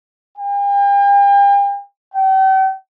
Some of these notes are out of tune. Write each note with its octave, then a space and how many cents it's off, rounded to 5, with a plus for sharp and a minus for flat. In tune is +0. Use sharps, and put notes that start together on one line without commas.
G5 +40
G5 -40